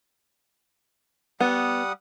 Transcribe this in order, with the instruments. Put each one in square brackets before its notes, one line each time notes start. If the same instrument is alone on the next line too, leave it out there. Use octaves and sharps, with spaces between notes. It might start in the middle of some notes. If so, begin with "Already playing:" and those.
[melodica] G3 F#5 D#6 [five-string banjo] B3